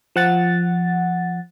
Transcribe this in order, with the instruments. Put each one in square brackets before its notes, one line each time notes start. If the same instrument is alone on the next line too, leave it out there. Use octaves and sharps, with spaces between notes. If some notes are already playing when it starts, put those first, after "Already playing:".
[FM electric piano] F3 F#5 A6